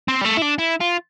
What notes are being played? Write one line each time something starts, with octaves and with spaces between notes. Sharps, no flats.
C4
G3
A3
E4
D4
E4
F4